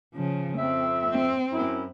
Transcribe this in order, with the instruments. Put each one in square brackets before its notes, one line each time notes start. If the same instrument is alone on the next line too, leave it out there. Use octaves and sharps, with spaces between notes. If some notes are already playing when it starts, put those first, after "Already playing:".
[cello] C#3 F3
[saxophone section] F2 E5 [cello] C4
[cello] C4
[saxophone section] F#2 E4